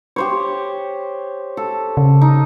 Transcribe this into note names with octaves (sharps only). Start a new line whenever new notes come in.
G4 C5 C#5
A4
C#3
D#4